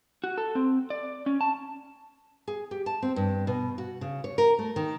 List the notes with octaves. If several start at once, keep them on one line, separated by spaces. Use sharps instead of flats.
F#4
A4
C4
D5
C#4
A5
G#4
G4
A5
C4
G2
B2
F#4
C#3
C#5
A#4
A3
D#3